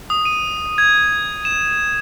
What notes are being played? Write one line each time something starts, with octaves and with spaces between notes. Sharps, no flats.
D#6
D#7
G#6
E7